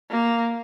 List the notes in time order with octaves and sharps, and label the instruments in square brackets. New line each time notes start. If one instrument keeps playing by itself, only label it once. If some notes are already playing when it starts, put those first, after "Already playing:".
[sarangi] A#3